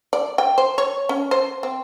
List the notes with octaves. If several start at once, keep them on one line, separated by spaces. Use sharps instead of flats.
D5
G5
C5
C#5
C#4
C5
C4